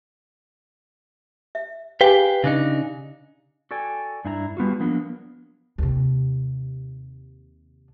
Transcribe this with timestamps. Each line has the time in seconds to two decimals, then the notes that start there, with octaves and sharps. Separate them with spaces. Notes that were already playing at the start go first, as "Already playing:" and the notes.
1.55 E5
2.01 G4 G#4 B4 F5 G5 G#5
2.44 C#3 D4 D#4
3.71 F#4 A4 D5 G5 G#5
4.25 G2 D4 E4 G#5 A#5
4.57 G3 B3 F4 F#4
4.80 F3 F#3 A#3 B3 D4
5.78 D#2 C3